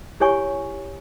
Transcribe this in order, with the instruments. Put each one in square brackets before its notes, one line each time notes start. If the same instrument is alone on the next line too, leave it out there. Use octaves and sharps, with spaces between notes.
[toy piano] E4 G4 C#5 G#5 C#6